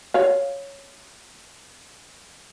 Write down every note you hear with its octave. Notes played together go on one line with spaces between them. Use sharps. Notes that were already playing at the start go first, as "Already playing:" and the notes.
C#5 F5